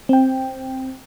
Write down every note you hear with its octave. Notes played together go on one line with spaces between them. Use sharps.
C4 G5